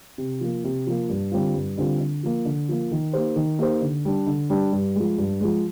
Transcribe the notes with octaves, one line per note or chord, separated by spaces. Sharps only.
C3
F3 A#3
C3
F3 A#3
G2
D3 G3 C4 F4
G2
D3 G3 C4 F4
D3
F3 A#3
D3
F3 A#3
D#3
A#3 D#4 G4 C5
D#3
A#3 D#4 G4 C5
D3
G3 D4
D3
G3 D4
G2
F3 G#3
G2
F3 G#3